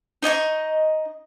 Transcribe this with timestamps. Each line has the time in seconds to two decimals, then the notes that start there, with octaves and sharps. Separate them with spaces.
0.22 D#4 D#5 G#5 C#6